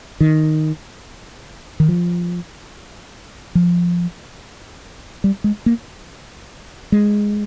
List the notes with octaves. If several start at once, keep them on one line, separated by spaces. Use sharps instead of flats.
D#3
D#3
F3
F3
G3
G#3
A#3
G#3